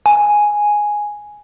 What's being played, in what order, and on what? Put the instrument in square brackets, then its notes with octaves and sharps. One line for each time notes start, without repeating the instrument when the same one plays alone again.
[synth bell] G#5